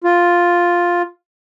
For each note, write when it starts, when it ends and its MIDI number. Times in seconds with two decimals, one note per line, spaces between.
0.04 1.02 65